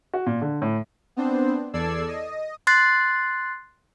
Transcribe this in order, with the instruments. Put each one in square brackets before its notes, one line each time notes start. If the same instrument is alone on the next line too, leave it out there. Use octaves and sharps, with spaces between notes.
[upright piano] F#4
A#2
D3
A2
[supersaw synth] B3 C4 D4 C5
E2 A4 D5 E6 G#6 C7
D#5
[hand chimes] C6 F#6 A6 C7